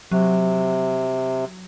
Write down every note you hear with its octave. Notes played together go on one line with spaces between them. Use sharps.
C3 F#3